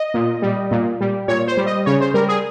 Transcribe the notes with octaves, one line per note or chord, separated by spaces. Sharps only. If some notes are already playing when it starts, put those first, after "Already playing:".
Already playing: D#5
A#2
G3
A#2
G3
A#2 C#5
C5
G3
D#5
C#3 C#5
C5
G3 A#4
G#4